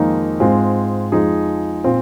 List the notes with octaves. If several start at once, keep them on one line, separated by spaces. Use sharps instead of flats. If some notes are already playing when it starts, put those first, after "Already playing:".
Already playing: F2 D#3 G#3 A#3 D#4
G#2 G#3 C4 F4
F2 F3 G#3 D#4 G#4
A#2 C4 F4